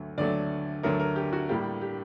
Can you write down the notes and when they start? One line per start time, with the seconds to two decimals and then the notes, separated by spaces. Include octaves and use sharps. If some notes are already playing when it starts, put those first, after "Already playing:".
Already playing: D2 D3 F#3 A3
0.18 D2 D3 F#3 A3 D5
0.83 D2 D3 F#3 A3 A#4
1.00 A#4
1.16 G4
1.33 F#4
1.49 A2 G3 A#3 D4 G4
1.81 G4